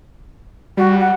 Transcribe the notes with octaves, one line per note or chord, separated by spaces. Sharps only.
G3 F#4
F#5